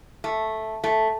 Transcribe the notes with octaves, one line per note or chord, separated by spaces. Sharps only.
A3
A3